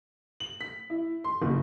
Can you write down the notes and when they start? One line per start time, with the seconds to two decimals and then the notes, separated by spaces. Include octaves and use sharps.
0.40 F#7
0.61 B6
0.90 E4
1.24 C6
1.42 F#1